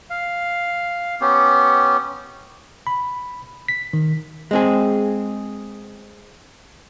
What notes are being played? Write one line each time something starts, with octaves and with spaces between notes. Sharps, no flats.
F5
B3 C#4 G4
B5
B6
D#3
G#3 C4 G#4